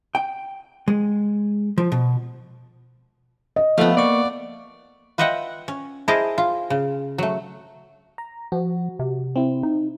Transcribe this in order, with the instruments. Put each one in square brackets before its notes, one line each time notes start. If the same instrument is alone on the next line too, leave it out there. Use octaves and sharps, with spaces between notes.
[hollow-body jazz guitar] G5
G#3
F3
B2
[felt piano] D#5
[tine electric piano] F3 A4 F#5 [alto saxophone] A3 [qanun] B3 F5
[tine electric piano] A#3 C#6 [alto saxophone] D5
[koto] F4 B4 D#5 E5 F#5 G5
C#4
E4 G#4 A#4 C5 D#5 A5
F4
C#3
F#3 A3
[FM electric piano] A#5
[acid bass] F3 [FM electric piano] F#4
[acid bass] C3
[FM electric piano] C4 E4
[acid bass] D#4